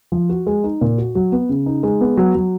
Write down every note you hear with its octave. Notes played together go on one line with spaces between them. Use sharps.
F3
F#4
G#3
D#4
A#2
F#4
F#3
B3
C#3
D#4
G#3
B3
F#3
F#3